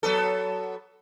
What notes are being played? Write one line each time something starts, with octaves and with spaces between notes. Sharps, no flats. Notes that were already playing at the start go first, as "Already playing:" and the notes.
F#3 B3 A4